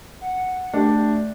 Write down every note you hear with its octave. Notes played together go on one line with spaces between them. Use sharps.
F#5
A3 D4 G4